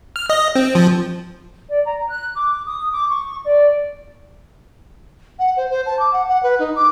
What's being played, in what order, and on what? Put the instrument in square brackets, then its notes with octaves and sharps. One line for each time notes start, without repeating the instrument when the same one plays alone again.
[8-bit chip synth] F6
D#5
C4
F3
[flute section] D5
A#5
F#6
D6
D#6
D6
C#6
D5
[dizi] F#5
C5
C5
A5
D6
F#5
F#5
B4
D#4
D6